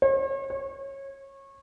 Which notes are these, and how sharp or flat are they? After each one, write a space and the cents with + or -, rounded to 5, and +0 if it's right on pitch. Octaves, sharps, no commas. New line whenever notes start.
C#5 -45
C#5 -25